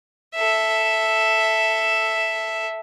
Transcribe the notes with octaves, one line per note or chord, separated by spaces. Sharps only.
A4 E5